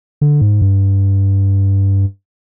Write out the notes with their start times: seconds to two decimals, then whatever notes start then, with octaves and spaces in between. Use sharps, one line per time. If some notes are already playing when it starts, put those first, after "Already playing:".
0.21 D3
0.41 G#2
0.62 G2